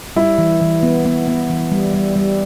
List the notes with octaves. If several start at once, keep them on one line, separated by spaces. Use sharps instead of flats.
G3 E4
E3
E3
B3
B3
B3
E3
G3
G3
G3